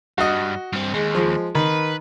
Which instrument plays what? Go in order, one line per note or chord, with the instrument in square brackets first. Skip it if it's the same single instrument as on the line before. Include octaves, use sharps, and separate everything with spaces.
[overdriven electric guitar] G2 [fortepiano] F#4 D#5
[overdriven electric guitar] G2 C4
[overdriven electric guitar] D#2 [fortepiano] G#3
[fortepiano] F3 G#3
[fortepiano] D#3 [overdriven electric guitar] B4